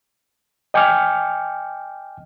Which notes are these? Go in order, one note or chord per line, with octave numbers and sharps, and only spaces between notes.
D#5 G5 G#5 D6 F6 G6